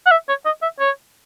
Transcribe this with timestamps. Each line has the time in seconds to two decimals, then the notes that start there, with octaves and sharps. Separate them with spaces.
0.06 F#5
0.12 E5
0.29 C#5
0.46 D#5
0.62 E5
0.80 C#5